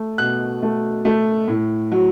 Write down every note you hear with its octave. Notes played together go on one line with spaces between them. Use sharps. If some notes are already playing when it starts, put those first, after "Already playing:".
Already playing: A3
B2 F#6
A3
A3
A2
F#3